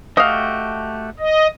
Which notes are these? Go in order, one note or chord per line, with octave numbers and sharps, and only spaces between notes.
A3 F#4 G4 D#5 F5
D#5